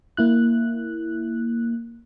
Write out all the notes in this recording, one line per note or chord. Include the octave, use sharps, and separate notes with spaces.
A#3 E4 F#6